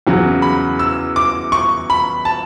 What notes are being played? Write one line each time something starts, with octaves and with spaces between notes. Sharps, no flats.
E2 C#3 F#3
B5
E6
D6
C#6
B5
A5